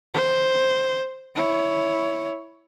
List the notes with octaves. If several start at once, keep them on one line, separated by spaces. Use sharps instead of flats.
C5
E4 C#5